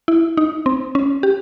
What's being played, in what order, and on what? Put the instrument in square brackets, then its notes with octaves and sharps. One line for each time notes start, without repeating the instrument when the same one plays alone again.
[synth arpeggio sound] E4
D#4
C4
C#4
G4